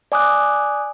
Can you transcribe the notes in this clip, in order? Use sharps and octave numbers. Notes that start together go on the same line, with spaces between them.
D5 G#5 D6 D#6 F#6